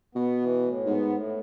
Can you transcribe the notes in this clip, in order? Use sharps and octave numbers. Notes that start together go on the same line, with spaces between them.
B2 B3
E3
A2
G#2 B3
A2